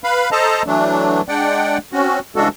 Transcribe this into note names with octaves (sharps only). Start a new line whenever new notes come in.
B4 F5 B5
A4 C5 D#5 A5 A#5
E3 F#3 A3 D4
G#3 D4 D5 F#5 G5
C4 C#4 F#4
C#3 E3 G#3 D4 F#4 A4